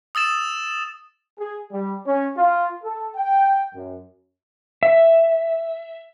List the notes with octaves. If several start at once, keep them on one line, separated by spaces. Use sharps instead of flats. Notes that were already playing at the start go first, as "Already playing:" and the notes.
D#6 E6 A6 E7
G#4
G3
C#4
F4
A4
G5
F#2
E5